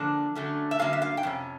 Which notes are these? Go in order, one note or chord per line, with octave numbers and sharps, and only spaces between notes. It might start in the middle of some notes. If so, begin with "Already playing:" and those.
Already playing: D3 F3 A#3 D4
D3 F#3 A3 C#4
E5
G2 D3 F#3 A#3 C#4 F5
E5
F5
G5
F2 C3 C#4